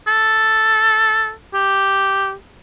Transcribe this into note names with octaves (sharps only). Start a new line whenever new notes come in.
A4
G4